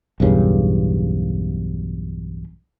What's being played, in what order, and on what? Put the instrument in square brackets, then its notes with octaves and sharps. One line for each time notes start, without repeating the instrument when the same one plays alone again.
[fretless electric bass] B1 E2 G2 C#3